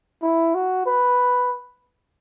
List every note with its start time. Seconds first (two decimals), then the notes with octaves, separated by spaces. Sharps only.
0.22 E4
0.54 F#4
0.86 B4